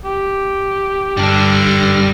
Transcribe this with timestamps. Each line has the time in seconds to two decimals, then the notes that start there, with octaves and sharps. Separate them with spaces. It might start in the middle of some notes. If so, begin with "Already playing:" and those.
0.05 G4
1.17 G2 D3 G3 D4 F6 A#6